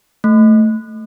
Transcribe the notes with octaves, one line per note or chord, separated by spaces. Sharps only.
A3